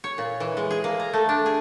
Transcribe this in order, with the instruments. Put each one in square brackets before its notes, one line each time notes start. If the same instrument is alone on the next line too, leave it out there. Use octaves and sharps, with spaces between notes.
[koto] C#5
A#2
E3
G#3
G#4
A#3
A#5
A3
D4
G#4